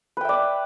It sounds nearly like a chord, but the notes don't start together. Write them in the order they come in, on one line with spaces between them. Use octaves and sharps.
B4 G5 E5 D5